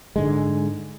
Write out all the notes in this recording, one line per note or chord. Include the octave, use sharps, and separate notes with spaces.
G#2 D3 G#3